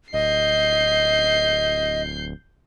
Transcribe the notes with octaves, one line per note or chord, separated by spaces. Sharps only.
D1 D#5 G6 C7